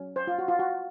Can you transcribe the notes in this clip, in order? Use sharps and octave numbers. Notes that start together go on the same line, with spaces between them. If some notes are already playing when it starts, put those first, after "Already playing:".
Already playing: F#3 C#4
C5
F4
F#4
F4
F#4